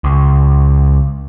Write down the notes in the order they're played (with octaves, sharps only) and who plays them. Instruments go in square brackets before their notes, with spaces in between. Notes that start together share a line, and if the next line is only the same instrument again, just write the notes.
[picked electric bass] C#2